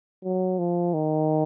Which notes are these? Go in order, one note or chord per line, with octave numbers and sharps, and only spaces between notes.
F#3
F3
D#3